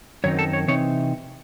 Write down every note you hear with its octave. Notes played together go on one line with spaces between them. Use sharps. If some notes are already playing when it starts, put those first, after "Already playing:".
F#2 D#3 F#3 C4 D#4 C#5
A4
C#5
C3 E3 C4 D#4 C#5